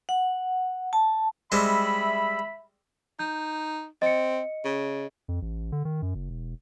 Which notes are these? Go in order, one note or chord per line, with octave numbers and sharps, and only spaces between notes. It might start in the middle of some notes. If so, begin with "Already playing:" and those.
F#5
A5
G3 G#3 C4 E5 B5
D#4 G6
C4 D#5 C#7
C#3
F2
A1
D3
D#3
F#2
F#1
E1